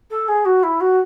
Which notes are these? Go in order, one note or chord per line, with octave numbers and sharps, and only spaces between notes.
A4
G#4
F#4
E4
F#4